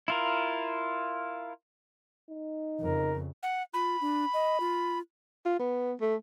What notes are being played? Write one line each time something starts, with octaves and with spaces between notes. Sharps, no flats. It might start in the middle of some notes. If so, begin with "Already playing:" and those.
E4 F4 A#4
D#4
F2 C#3 A#4
F#5
F4 B5
D4
D#5
F4
F4
B3
A3